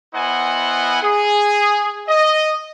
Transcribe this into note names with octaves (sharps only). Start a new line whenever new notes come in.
B3 E4 C5 D#5 F#5 G#5
G#4
D#5